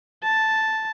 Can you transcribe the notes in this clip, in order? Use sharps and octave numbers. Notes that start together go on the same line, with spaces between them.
A5